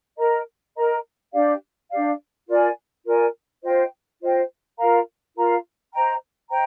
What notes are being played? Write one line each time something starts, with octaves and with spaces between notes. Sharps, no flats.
A#4 D#5 A#5
A#4 D#5 A#5
D4 G4 D5 F5
D4 G4 D5 F5
F4 A#4 D5 G#5
F4 A#4 D5 G#5
F4 C5 D#5 G5
F4 C5 D#5 G5
F4 A#4 F5 A#5
F4 A#4 F5 A#5
C5 D#5 G5 A#5
C5 D#5 G5 A#5